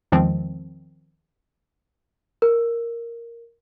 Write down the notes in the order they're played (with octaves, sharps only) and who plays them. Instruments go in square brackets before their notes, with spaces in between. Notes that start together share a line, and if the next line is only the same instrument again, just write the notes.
[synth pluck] E2 D#3 F3 G#3 C4
[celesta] A#4